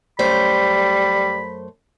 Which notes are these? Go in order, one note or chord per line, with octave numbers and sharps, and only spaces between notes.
F#2 G3 A3 C5 B5